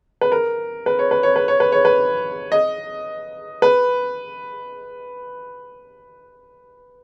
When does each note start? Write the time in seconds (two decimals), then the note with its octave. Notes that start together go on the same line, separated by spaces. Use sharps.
0.21 B4
0.32 A#4
0.86 B4
0.99 C#5
1.11 B4
1.23 C#5
1.36 B4
1.48 C#5
1.60 B4
1.72 C#5
1.85 B4
2.52 D#5
3.62 B4